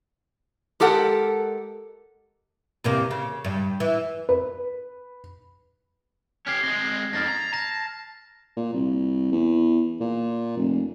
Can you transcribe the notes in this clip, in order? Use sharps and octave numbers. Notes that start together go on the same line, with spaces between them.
G#3 G4 A4 A#4 F#5
E2 C3 A#3
C#3
G2
E3
B4
C#4 G4 F6 G#6 C7
G#3 C4 A#6
F2 D#3 F6 A6 A#6
A#5
A5 A#6
A#2
C2
E2
A#2
F1